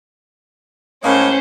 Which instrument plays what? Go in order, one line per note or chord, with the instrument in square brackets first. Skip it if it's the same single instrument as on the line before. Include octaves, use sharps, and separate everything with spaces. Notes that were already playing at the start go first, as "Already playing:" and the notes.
[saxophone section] A2 G#3 A#3 [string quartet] C#4 C5